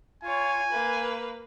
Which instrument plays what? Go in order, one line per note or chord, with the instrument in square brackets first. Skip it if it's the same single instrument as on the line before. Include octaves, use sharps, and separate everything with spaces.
[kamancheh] F4 C#5 [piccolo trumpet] G#5
[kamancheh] A#3 B4